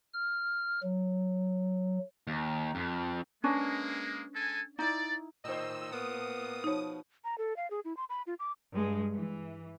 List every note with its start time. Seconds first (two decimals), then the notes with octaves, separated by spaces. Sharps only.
0.14 F6
0.83 F#3
2.27 D#2
2.75 F2
3.44 G#3 A#3 C#4 D4 B4
4.34 G#3 A4 G#5
4.79 D#4 E4 D5
5.45 A2 D#3 C5 D#5 E6
5.92 A#3 B3 D#6
6.64 B2 F3 D#4 C#5
7.24 A#5
7.38 A4
7.57 F5
7.71 G#4
7.85 E4
7.97 C6
8.09 B5
8.27 F4
8.39 D6
8.73 G2 G#3
9.14 E3